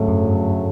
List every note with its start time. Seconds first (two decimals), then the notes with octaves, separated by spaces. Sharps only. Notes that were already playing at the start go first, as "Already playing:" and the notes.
Already playing: D2 G#2 C#3 F#3 A3
0.08 F#2
0.25 G2